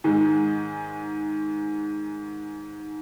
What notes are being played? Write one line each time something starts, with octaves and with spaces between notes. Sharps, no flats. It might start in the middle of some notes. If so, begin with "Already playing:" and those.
G#2 D#3 G#3